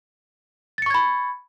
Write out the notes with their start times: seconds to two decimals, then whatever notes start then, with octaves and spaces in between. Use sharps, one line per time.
0.78 A6
0.82 C#7
0.86 C#6
0.90 G#6
0.94 B5